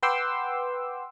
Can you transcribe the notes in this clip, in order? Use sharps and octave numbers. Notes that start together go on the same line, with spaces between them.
B4 F#5 G5 C6 D6 E6